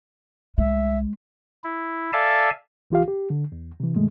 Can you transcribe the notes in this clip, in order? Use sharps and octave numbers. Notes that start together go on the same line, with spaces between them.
C2 G#3 E5
E4
A4 D5 E5 F5 G#5 A5
C2 E3 F4 G4 F5
G4
D3
E2
C3 E3
G2 B2 D#3 G#3 A3